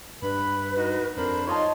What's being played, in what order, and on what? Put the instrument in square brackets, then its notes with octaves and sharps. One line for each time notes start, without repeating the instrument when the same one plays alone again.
[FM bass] G2 [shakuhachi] B4 [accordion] B5
[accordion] D#4 F#4
[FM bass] F2 [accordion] D4 C5 B5 [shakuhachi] A#4
[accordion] D#4 F4 [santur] C#5 D#5 A5 [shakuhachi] C6